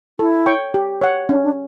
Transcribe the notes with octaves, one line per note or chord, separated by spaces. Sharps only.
E4 A4
C#5 G5 C#6
G4
C#5 F#5
C#4 D4
D4